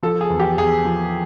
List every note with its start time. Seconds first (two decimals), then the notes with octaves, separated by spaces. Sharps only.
0.03 F3 A4
0.21 G#4
0.30 E2
0.40 G4
0.57 E2 G#4
0.85 F3